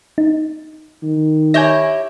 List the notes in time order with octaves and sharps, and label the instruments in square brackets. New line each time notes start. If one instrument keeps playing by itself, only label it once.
[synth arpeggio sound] D#4
[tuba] D#3
[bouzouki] E4 G4 C#5 [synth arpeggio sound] G#5 G6 A#6